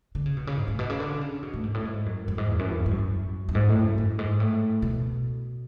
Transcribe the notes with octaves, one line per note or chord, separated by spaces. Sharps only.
D3
C#3
B2
C#3
G#2
A2
B2
C#3
D3
C#3
B2
A2
G#2
A2
G#2
F#2
F#2
G#2
E2
F#2
E2
G#2
F#2
F#2
G#2
A2
F#2
F#2
G#2
A2
B2